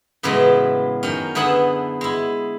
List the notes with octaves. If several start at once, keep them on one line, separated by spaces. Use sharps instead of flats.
A2 C#3 E3 F#3 G#3 B3
F#2 D#3 C#4
D3 B3 E4 G#4 F#5 A5
G#3 E4